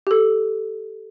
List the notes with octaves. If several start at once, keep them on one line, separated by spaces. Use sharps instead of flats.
G4 A4